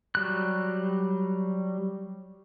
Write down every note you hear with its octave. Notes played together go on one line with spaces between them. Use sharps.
F#3 G3 F#6